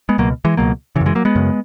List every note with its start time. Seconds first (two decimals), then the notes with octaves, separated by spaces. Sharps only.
0.09 G#3 B3
0.18 C#2 B2 F#3 A#3
0.45 E3 G#3
0.57 C#2 B2 F#3 A#3
0.96 C#3 E3
1.01 F#2
1.06 E3 G#3
1.15 F#3 A#3
1.25 G#3 B3
1.36 F#2 C#3